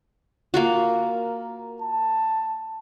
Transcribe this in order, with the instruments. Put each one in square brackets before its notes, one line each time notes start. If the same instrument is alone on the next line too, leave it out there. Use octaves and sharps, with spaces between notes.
[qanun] A#3 F4 F#4
[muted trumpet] A#4
A5